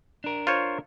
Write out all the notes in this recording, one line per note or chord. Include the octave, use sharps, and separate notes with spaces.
D4 A#4
F4 C5 C#5